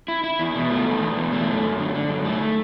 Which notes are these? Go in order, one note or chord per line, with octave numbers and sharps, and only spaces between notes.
E4
E4
E2
B2
A3
E2
E2
B2
A3
F#2
F#2
D3
D3
F#2
A3